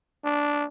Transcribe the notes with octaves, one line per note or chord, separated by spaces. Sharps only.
D4